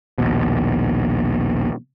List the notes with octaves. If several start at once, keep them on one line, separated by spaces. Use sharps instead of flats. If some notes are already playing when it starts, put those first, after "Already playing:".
A#1 D#2 B2